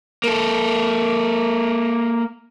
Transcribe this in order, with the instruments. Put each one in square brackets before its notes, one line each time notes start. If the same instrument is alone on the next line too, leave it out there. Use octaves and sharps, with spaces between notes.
[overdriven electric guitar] A#3 A4